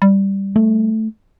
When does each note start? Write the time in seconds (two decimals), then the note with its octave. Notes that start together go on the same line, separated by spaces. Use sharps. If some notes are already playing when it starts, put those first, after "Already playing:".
0.02 G3
0.56 A3